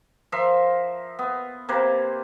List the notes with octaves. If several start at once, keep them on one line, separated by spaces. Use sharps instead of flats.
F3 A#4 E5 C6
B3
C3 A#3 B4 C5